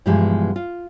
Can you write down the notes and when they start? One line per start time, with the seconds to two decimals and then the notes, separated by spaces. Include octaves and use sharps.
0.06 G2 B2 E3 F3 G3 G#3
0.56 F4